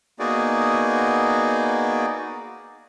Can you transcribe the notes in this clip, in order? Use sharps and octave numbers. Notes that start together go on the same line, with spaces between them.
A#3 B3 D#4 F#4 G#4 D5